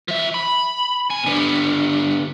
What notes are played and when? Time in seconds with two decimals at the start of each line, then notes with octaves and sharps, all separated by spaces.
0.08 F3 E5
0.34 B5
1.10 B2 G#5
1.26 D3 B3